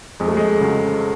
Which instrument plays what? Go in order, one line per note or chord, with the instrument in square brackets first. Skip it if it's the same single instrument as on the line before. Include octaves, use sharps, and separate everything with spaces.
[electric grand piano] F2 [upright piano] G#3
[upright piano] A3
G#3
[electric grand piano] C#3 F#3